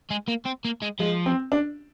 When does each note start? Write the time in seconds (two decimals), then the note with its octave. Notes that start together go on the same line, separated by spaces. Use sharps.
0.11 G#3
0.28 A#3
0.46 C4
0.65 A#3
0.82 G#3
0.99 F3 G#3
1.26 C4
1.52 D4